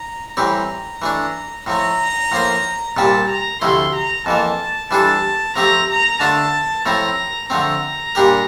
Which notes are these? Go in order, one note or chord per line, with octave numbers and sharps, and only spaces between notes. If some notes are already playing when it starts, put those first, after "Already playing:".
Already playing: A#5
A2 E3 G3 C4 G4 A#5
E3 A3 D4
A2 F3 A3 A#5
A2 F3 A#3 F4 C5
C2 A#2 G3 C4 G4 A5
A#5
D2 C3 F3 A3 E4 C6
A#5
F2 E3 A#3 A5
E3 G3 D4 F4 A4 A5
F3 A3 C4 G4 A#5
A#5
D3 A3 D4 F4 A5
A2 F3 A3 C4 E4 A#5
D3 F3 A3 C4 A#5
A#2 G3 D4 G4 A#4